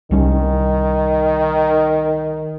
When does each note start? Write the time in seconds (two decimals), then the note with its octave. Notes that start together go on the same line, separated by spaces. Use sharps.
0.11 C2 D#3 G3 C#4